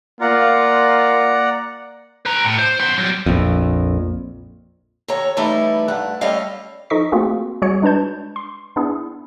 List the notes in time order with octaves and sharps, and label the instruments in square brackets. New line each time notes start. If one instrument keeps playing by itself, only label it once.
[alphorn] A#3 [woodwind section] F4 [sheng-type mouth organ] D5 F#5 A#5
[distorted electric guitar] B4 A#5
A2
C5
B3 C5
F#3 G3
[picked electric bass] A#1 F2
[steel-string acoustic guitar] D#2 A4 C#5 A#5
E3 G3 A3 D#4 E4
G2 A3 F#5
G3 A3 C#4 A4 D#5 F5
[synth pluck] F3 D#4 A4 D#5 C#6 B6
A3 A#3 C4 F4 F#4 G#4
G3 F#4 G#4 C#5 C#7
G#3 D4 B4 A5 G6
C6
B3 D4 E4 G#4